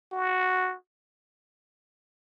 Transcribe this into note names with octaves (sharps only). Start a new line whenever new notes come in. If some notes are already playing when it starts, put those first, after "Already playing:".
F#4